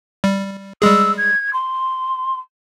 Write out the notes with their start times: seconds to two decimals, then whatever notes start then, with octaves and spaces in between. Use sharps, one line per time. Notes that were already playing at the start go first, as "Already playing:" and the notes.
0.24 G3
0.82 G3 G#3 G#4 E6
1.17 G#6
1.53 C6